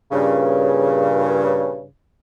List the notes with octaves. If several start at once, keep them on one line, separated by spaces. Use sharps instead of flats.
G2 A#2 C#3